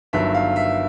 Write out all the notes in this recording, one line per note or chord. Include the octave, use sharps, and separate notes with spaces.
G1 G2 D#3 F#3 E5
F5
E5